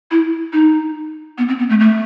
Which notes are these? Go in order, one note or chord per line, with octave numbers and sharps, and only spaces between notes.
E4
D#4
B3
C4
B3
A3
A3